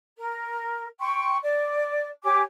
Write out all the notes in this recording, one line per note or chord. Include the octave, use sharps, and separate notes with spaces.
A#4
G5 C6 C#6
D5
G4 C#5 G#5 D6